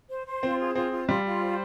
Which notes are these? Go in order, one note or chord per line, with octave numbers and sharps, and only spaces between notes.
C5
C5
C4 F4
G#4
C4 F4
F4
G3 F4
F4
C5